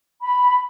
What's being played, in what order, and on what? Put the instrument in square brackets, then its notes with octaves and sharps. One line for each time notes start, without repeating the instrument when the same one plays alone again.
[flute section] B5